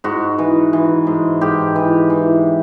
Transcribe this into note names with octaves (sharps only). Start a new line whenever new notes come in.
G#2 F#4
E3
E3
G#2
G#2 G4
E3
E3